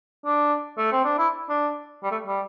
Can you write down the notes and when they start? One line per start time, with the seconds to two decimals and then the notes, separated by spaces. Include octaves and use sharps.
0.25 D4
0.78 A3
0.92 C4
1.05 D4
1.18 E4
1.49 D4
2.03 G3
2.11 A3
2.27 G3